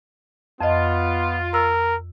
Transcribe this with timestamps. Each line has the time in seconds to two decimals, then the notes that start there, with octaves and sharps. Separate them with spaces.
0.61 F2 B3 F4 D#5
1.54 A#4 E6